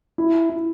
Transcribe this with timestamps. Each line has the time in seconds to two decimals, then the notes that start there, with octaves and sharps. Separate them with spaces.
0.18 E4
0.50 E4